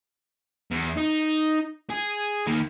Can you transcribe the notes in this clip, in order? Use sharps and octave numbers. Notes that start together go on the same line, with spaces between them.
E2
D#4
G#4
D#3 A#3